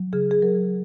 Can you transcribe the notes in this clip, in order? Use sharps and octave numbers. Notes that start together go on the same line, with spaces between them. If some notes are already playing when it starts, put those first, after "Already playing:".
Already playing: F#3
C#3 G#4
G#4
F#3 A#4